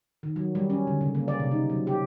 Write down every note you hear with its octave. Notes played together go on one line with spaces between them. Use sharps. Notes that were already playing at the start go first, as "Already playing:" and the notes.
D#3
F#3
G3
C#4
D3
C#3
A#3
D5
C3
D#4
F#3
G4